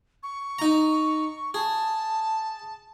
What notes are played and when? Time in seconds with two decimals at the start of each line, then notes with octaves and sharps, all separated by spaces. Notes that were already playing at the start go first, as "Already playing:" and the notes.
0.23 C#6
0.59 D#4 A#5
1.54 G#4 A5